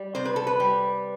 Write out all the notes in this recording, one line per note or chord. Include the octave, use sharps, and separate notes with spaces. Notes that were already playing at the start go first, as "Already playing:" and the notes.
Already playing: G3
C3 C5
B4
A4
B4
G3